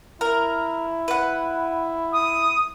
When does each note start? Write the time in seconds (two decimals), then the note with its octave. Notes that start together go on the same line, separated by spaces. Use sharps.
0.21 E4 A#4
1.08 B4 F#5
2.13 D#6